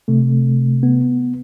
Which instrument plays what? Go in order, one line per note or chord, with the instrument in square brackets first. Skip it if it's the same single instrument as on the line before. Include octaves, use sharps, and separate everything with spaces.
[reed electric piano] C3 A3
[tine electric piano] B3